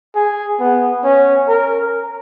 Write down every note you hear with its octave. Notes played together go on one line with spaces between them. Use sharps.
G#4
B3
C#4
A#4